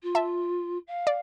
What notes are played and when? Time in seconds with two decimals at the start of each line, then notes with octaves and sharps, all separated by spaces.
0.02 F4
0.15 E5 A5
0.87 F5
1.07 D5